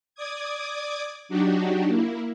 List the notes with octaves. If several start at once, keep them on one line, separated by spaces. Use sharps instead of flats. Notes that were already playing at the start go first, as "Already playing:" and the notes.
D5 D6 D#6 G#6
F#3 D4 D#4 F#4 G4
A#3 E4